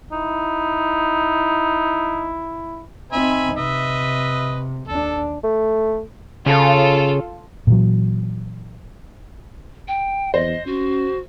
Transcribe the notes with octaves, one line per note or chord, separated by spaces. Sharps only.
D#4 E4
C4 D#4 E5 G#5 B5
C3 B4 D#5 E5
D#2 D4 A4
A3
C#3 F4 A4
A#2 E3 F#3
G5
E2 C5 D#5
C#4 F#4